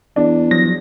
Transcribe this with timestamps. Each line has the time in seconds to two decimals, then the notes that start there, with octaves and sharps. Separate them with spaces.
0.16 E2 D4
0.51 F3 F#3 A#6